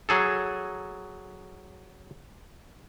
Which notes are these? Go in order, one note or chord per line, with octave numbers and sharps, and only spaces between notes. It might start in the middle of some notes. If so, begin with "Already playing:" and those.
F#3 G#4 A4